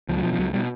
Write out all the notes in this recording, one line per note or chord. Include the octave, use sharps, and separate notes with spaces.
C#2 F3
F#3
B2 F3
F3
C#2 F#3
B2 G3